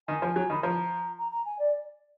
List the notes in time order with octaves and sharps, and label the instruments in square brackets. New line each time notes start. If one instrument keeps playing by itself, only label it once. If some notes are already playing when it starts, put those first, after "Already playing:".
[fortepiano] D#3 [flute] G#5
[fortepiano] F3
F#3
[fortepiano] D#3 [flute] B5
[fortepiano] F3 [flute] A#5
[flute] A#5
A#5
G#5
D5